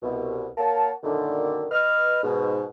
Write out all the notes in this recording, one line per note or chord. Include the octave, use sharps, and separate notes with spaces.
C2 B2
A#3 A#4 C#5 F5 F#5 A5
F#2 A#2 D3 D#3
B4 D#5 F6
G#2 B2